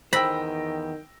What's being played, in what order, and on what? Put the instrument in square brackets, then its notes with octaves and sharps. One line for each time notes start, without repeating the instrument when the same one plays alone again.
[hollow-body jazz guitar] E2 B3 C5 [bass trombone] D#3 [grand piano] G5 E6 A#6 [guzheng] B5